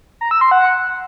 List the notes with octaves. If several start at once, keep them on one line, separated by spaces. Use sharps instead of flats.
A#5
E6
C6
F#5